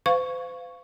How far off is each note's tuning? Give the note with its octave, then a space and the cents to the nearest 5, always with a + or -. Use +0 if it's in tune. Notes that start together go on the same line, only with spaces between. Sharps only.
C5 -45 F5 +0 C#6 +0